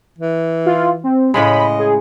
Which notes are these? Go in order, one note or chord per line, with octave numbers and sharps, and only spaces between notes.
E3
F4
C4
A2 C#3 G#3 D#5 B5
G#4